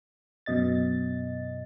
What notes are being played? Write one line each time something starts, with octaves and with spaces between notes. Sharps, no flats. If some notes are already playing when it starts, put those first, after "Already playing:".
F#2 B2 D#5 A6